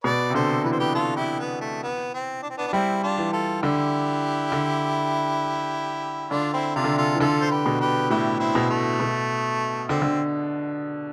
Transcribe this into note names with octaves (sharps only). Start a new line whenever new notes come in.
B2 B4 D5
C3
D3 A4 C5
E3 B4
C5
G4 B4
F4 A4
E4 G4
B3
A3
B3
C4
D4
C4
B3 D4
D4
G3 C4 E4
D4 F4
E3
F4 A4
D3 E4 G4
D3
D3 D4 F4
C4 E4
C3 D4 F4
D3
C3
F4 A4
E3
D3 F4 A4
C5
G4 B4
B2
G4 B4
A2 E4 G4
C4 E4
B2
A3
B2
D3 C4
D3